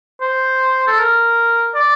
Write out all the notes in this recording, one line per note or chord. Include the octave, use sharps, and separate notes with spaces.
C5
A4
A#4
D5